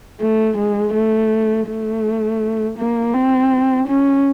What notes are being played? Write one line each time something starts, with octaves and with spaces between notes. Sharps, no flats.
A3
G#3
A3
A3
A#3
C4
C#4